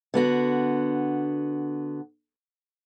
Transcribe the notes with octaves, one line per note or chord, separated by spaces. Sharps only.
D3 B3 F#4